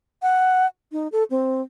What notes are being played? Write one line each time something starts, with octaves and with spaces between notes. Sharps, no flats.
F#5
D#4
A4
C4